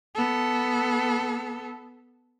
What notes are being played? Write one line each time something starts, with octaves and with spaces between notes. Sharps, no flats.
B3 A4